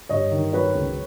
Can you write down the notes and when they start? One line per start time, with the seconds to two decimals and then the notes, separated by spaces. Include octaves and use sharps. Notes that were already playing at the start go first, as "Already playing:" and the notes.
0.09 G2 C#5 D#5
0.31 D#3
0.53 F#3 B4 C#5
0.75 C#2